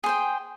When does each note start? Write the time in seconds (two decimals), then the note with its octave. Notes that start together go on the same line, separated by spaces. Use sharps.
0.04 G#4
0.06 C5
0.09 G5